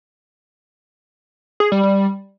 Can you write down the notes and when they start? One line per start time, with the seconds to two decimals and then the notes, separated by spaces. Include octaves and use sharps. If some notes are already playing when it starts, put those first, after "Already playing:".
1.60 G#4
1.72 G3
1.83 G3